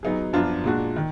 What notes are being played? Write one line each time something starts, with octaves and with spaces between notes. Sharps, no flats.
F#3 B3 D#4 G#4
F#2 F3 B3 D4 F4
A#2 G#3 D4 F#4
D#3